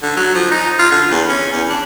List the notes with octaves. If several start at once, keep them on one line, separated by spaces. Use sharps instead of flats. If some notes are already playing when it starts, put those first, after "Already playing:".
D3
F#3
F3
D#4
F4
D3
E2
C#4
E2
D4